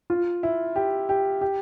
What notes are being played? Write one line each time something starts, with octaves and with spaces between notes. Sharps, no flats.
F4
E4
G4
G4
G4